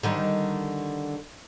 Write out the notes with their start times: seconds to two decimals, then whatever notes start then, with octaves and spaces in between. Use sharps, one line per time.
0.03 D3 D#3 G3